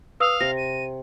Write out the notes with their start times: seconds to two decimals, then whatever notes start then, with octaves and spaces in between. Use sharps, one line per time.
0.20 B4 F5 D#6 E6
0.40 C3 A#6
0.57 D#7